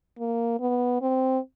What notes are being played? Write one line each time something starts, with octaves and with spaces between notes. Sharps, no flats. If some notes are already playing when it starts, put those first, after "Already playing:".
A#3
B3
C4